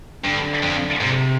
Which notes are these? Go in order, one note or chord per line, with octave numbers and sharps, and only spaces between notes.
G2 D3
F2
G#2 C3